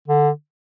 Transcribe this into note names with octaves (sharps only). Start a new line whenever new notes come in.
D3